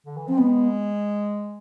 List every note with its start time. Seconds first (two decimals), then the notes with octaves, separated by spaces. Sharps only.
0.06 D3
0.17 E3
0.27 F3 C4
0.37 G#3 B3